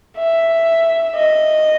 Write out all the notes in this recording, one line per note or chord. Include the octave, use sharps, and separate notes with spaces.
E5
D#5